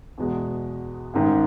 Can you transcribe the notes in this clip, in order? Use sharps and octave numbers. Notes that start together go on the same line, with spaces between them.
E2 B2 G#3
A1 G#2 D#3